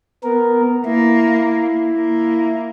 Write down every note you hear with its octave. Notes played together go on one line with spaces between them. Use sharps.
B3 A#4
A#3 E4
A#3